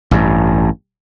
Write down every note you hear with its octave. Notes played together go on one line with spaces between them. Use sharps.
A1 G2